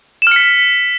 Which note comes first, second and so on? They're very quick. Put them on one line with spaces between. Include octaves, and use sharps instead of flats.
E7 F6 C#7 B6